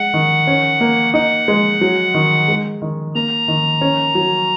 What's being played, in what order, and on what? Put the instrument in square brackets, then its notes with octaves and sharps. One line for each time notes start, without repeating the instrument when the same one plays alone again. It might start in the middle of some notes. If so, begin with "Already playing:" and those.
Already playing: [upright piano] G#3 [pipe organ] F#5
[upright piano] D#3
C#4
A#3
[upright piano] D#4 [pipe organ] F#5
[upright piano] G#3
F#3
D#3
G#3
D#3
[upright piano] A#3 [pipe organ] A#5
[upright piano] D#3
C#4
F#3